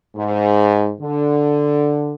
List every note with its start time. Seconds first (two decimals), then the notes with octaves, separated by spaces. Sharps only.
0.16 G#2
1.00 D3